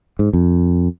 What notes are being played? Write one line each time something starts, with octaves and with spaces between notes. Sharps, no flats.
G#2
F2